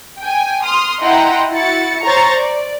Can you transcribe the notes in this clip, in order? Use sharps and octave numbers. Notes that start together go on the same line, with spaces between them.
G5 G#5
C6 D#6 F6
E4 D#5 F#5 G5 A#5 C6
E4 F#4 A6 C#7
C5 C#5 A#5 C#6 A6
D5